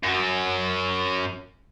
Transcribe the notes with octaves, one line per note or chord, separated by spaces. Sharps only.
F#2 F#3